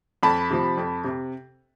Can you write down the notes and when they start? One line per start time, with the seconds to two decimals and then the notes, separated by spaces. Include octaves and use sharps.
0.23 F2 A5 B5
0.50 C3 F3
0.77 F2
1.04 C3